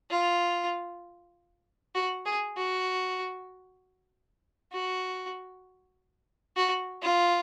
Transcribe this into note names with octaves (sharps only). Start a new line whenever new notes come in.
F4
F#4
G#4
F#4
F#4
F#4
F4